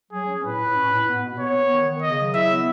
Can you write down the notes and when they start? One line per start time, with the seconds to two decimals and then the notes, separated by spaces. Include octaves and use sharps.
0.12 F#3 G#4
0.28 C#4
0.44 A2 B4
0.60 A2
0.76 C#4
0.91 A2
1.07 B3
1.23 B2
1.39 B3 C#5
1.55 B3
1.71 D#3
1.87 D#3
2.02 C#3 D#5
2.18 F#3
2.34 E4 E5
2.49 B3